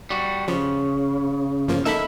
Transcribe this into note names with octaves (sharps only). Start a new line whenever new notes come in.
G3 F#4
C#3 F3
G1 F3 A#3
A#3 D#4 A4 E5 B5